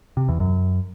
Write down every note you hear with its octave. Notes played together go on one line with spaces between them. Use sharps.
C3
E2
F#2